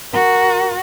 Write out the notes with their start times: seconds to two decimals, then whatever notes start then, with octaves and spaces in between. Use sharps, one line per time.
0.14 F#4 A#4